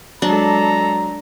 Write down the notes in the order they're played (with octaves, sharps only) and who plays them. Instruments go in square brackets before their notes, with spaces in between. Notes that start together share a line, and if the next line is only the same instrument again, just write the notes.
[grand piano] F#3 [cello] G#3 A4 [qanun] D4 [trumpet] A#5